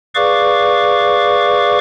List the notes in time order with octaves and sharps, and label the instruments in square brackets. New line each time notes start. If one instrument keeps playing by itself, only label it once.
[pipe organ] G#4 B4 D5 F5 C#6 D6